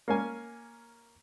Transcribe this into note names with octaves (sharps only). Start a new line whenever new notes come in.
A#3 C#4 G#5